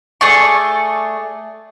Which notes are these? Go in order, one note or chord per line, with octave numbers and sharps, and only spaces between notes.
A3 G#4 D5 C#6